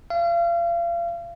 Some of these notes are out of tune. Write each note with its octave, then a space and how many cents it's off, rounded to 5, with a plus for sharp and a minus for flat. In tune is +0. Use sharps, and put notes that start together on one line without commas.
F5 -35